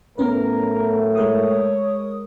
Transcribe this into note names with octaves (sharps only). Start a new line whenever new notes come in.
A2 F#3 A3 B3 C#4 A#4 B4
G#3 A#4 C#5 D#6